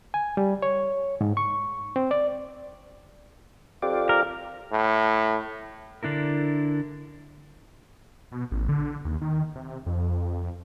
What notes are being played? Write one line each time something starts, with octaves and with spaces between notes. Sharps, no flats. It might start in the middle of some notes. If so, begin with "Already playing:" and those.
G#5
G3
C#5
G#2
C#6
C4
D5
F2 F4 G4 D5
A#4
A2
D3 D4 E4 A#4
B2
A1
D3
D#2
D#3
C3
F2